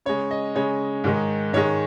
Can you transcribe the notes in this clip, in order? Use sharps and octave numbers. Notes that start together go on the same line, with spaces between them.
C#3 G#3 C#5
D#5
C#3 G#3 C#5
G#2 D#3 G#3
G#2 D#3 G#3 C#5